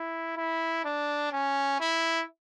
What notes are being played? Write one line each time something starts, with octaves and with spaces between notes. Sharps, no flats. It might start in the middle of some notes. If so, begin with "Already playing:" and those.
Already playing: E4
E4
D4
C#4
E4